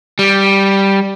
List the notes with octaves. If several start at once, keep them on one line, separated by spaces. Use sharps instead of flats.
G3